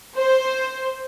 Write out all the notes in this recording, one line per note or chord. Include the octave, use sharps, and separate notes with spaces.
C5